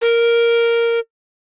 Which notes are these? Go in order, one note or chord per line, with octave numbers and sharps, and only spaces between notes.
A#4